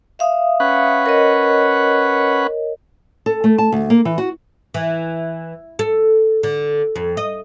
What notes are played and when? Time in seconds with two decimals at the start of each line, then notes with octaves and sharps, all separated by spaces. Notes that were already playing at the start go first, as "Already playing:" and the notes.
0.19 E5 F5 D#6
0.60 C#4 B4 F#5
1.06 A#4 C#5 D#5
3.26 A4
3.44 A3
3.58 A5
3.72 D2
3.90 A#3
4.05 E3
4.18 F#4
4.74 E3
5.79 A4
6.43 D3
6.96 F2
7.17 D#5